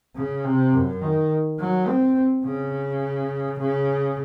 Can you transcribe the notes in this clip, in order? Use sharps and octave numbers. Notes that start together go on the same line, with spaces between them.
C#3
C3
F#2
D#3
F#3
C4
C#3
C#3